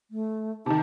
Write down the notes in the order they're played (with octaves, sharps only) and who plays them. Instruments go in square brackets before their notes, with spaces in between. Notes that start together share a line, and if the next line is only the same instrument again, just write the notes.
[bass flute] A3
[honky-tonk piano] C3 D#3 [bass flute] D#4 [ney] A5